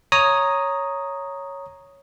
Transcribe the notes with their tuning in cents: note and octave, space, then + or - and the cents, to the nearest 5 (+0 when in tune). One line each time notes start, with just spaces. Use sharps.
C#5 +0 A#5 +0 D#6 +0